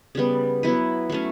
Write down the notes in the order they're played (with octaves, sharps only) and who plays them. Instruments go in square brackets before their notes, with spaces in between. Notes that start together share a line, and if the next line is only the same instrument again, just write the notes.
[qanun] C#3 G3 B3
F#3 B3 E4 B4
F#3 A3 C#4